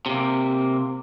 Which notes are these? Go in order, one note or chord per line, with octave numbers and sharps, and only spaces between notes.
C3 A#3